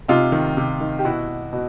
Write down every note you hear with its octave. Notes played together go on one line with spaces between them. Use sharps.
C3 D#4 F4
D#3
C3
D#3
G4
B2 E4 F#4
B2